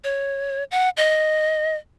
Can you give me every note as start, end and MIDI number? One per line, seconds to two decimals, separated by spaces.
0.04 0.64 73
0.71 0.89 78
0.97 1.75 75